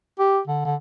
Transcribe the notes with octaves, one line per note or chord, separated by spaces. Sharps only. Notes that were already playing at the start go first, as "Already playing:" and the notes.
G4
D3
D3